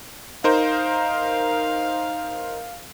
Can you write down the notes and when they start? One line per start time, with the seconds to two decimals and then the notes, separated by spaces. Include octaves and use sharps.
0.44 D#4 A#4 C5 F5